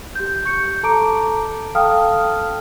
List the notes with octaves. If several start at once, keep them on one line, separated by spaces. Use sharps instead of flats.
G4 G6
C#6 G6 C#7
A4 A5 A#5 D6 D7
A4 F5 G5 A5 D#6 F6